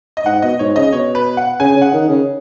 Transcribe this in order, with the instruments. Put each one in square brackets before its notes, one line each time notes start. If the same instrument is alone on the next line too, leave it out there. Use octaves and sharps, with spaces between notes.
[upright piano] D#5
[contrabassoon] G#2 [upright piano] F#5
[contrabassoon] B2 [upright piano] D#5
[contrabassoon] G#2 [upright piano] C#5
[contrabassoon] C#3 [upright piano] D#5
[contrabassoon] B2 [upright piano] C#5
[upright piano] B4
F#5
[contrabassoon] C#3 [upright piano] G#5
[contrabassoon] C#3
[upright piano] F#5
[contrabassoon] D#3
C#3